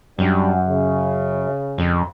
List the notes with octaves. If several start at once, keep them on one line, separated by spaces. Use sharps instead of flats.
F#2 G3 D4
C#3
F2